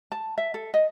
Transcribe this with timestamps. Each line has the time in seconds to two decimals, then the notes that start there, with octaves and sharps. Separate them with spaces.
0.12 A5
0.38 E5
0.54 A4
0.74 D#5